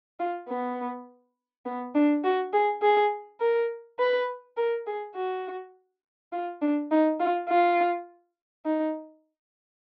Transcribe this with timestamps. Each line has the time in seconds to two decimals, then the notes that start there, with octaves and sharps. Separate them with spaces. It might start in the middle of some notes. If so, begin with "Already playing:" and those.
0.20 F4
0.49 B3
1.66 B3
1.95 D4
2.24 F#4
2.53 G#4
2.82 G#4
3.41 A#4
3.99 B4
4.57 A#4
4.87 G#4
5.16 F#4
6.33 F4
6.62 D4
6.91 D#4
7.20 F4
7.49 F4
8.66 D#4